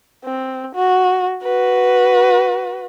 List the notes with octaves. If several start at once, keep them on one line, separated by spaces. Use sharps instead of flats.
C4
F#4
F#4 B4